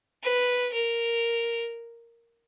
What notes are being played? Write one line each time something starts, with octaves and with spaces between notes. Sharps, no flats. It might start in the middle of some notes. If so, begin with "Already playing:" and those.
B4
A#4